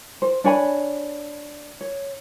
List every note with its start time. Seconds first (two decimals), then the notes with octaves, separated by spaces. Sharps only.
0.22 C5
0.44 D4 C#5 G#5 B5
1.81 C#5